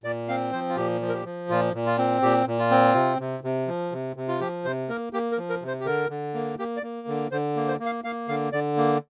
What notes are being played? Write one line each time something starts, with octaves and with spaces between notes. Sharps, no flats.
A#2 D5
C4 F5
F3 C5
F4
A#2 G4
F3
A#4
G4
F3
A#2 F4
A#2
F4
C4
A#2 G4
A#2
F4
C4
C3
C3
C3
F3
C3
C3
F4
F3 G4
C3 C5
A#3 A#4
A#3 G4
A#4
F3
A#4
C3
C5
G4
D3 A#4
D3
A#3
A#3 G4
D5
A#3
D3
D3 C5
A#3
C5
A#3
F5
A#3 F5
D3 F5
D3 D5
A#3